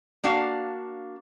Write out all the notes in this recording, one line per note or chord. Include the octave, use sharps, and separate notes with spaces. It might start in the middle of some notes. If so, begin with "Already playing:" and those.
A#3 D4 F#4 F5